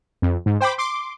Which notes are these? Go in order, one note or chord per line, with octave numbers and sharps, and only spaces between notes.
F2
G#2
C5 G5 B5 D6
C6 D6